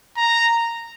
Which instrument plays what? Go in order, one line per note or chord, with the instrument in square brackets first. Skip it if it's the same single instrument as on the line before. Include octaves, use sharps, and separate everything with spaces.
[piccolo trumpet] A#5